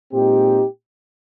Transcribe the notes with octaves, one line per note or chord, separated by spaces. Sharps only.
A#2 G#3 C4 D#4 G4